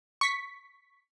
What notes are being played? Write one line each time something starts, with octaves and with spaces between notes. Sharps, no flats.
C#6 B6